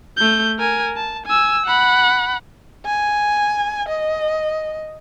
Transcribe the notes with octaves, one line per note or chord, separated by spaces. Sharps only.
A3 G6
A#4 G#5
A5
G#5 E6
F#5 B5
G#5
D#5